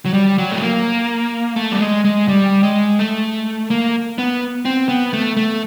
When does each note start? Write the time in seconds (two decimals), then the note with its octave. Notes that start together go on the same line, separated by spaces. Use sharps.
0.05 F#3
0.13 G3
0.38 F#3
0.51 A3
0.62 A#3
1.56 A3
1.72 G3
1.80 G#3
2.05 G#3
2.28 G3
2.63 G#3
2.99 A3
3.70 A#3
4.18 B3
4.65 C4
4.89 B3
5.13 A3
5.37 A3